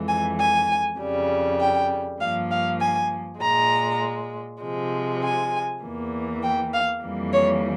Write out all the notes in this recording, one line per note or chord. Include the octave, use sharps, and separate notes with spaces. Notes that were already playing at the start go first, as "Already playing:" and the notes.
Already playing: F2 E3 G#3
G#5
G#5
F2 C#3 G3
G5
G2 F3 A#3 F5
F5
G#5
A#2 G#3 A#5
C3 F3 G#3
G#5
E2 E3 A#3
G5
F5
F2 E3 G3 A#3
C#5